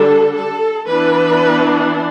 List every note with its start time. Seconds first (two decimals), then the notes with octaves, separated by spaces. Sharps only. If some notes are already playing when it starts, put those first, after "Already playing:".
Already playing: D3 G3 D4 A4
0.36 A4
0.88 E3 B3 D4 B4